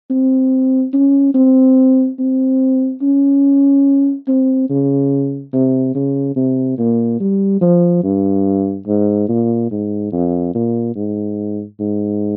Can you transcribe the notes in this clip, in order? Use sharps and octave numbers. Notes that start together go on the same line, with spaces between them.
C4
C#4
C4
C4
C#4
C4
C#3
C3
C#3
C3
A#2
G3
F3
G2
G#2
A#2
G#2
F2
A#2
G#2
G#2